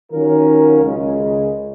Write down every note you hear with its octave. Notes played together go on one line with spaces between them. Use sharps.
D#3 F#3 C#4 F4 A#4
C#2 C#3 G#3